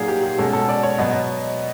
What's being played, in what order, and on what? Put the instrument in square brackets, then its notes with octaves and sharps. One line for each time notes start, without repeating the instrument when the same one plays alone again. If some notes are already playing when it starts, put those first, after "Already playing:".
Already playing: [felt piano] A#2 F#3 A#3 D#4 [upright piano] G#4
[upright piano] G4
G4
[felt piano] B2 G#3 C#4 [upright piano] A4
[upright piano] A4
D5
C#5
[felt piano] B2 F#3 B3 [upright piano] D#5